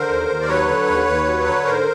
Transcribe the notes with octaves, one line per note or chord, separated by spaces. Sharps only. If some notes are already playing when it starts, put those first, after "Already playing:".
Already playing: D3 A#4 C5
D#2
D#2
D5
F#3 B4 C#5
D3
D#2
D#2
F#3
D3
G#2 A#4 C5